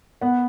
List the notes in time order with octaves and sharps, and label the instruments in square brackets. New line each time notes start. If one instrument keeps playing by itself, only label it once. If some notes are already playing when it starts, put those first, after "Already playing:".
[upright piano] B3 F#5